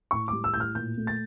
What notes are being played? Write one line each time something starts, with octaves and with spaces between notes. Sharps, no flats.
A2 C#6
G3 D6
E6
A2 G6
F6
A#2 G6
A3
A6